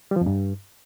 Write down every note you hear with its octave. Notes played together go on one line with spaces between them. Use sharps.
G3
F3
F2
G2